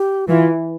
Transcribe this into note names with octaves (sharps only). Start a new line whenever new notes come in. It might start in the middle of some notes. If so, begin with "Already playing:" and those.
Already playing: G4
E3 F4